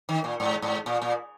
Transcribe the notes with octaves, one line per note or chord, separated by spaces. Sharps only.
D#3
A#2
G#2
G#2
A#2
A#2